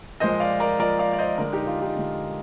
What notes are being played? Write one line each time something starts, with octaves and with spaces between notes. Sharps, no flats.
A#2 F3 G#3 C5 D#5
D5 F5
A#4 D5
A#2 F3 G#3 A#4 D5
D5 F5
D5
C5 D#5
D3 G#3 A#4 D5
D#4 G4
F4
D#4 G4
D3 G#3